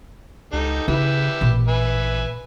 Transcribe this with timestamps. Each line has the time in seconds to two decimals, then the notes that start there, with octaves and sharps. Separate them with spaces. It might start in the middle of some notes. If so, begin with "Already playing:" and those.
0.53 C#2 D#4 G4 A4
0.88 C#3 E4 G4 B4 E5
1.41 A1 A#2
1.68 B4 E5 G#5